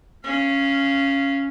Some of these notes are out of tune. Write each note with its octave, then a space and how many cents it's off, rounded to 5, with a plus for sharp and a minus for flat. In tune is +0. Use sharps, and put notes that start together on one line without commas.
C#4 +0 F5 -20